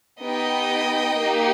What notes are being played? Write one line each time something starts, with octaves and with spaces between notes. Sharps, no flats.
B3 D#4 G4 D#5 G5
A#3 D#4 G4